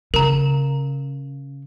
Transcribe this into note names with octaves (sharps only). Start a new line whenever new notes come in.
C#3 A#4 A#5